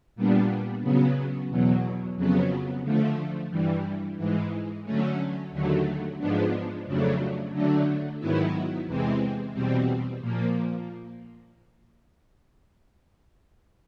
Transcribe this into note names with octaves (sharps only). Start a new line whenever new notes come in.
A#2 G3 B3 D4
C#3 F#3 B3
E2 B2 F#3
F2 C#3 F#3 B3
D3 F3 A3
G2 E3 G3
G#2 E3 G#3
D3 F#3 A3 C#4
D#2 D3 F#3 A3
G#2 F3 G#3 B3 D4
F2 C#3 F#3 A3 D4
D3 F#3 A3 D4
G#2 D#3 F#3 B3 E4
E2 C3 E3 G#3 C4
E2 B2 G3 C4
A#2 F3 A#3